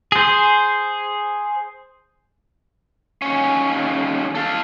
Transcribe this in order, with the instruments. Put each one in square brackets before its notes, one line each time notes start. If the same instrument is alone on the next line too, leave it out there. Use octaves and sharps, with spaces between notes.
[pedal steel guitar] G#4 C5
[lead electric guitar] D#2 C#4
A4 F5